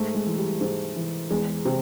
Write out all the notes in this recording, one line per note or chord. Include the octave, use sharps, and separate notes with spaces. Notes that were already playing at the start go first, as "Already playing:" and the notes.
Already playing: G#2 A3
G#3
E3
G3
G#2
E3
E2 G#3
C3